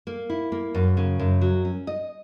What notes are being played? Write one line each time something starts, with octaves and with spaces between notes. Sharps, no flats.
A#3
E4
A#3
F#2
C#3
F#2
F#3
C#4
D#5